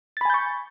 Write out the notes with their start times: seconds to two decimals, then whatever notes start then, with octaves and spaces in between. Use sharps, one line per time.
0.17 A6
0.21 B5
0.25 G#5
0.30 G6
0.34 C#6